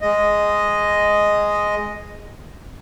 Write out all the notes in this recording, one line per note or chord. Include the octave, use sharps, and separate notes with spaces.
G#3 D#5